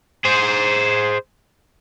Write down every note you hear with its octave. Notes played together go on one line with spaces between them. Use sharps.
G#4 C5